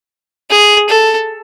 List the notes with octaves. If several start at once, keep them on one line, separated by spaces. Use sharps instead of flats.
G#4
A4